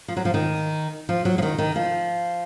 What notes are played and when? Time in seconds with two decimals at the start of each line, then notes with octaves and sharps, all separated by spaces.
0.08 F3
0.17 F#3
0.25 F3
0.34 D#3
1.09 F3
1.25 F#3
1.38 F3
1.42 D#3
1.58 D#3
1.76 F3